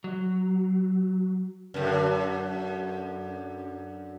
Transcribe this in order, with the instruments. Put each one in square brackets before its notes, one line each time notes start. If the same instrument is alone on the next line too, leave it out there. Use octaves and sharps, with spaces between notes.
[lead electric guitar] F#3
[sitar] F#2 D3